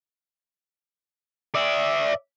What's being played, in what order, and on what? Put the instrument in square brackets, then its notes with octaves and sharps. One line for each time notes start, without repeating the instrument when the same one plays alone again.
[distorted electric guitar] D5 E5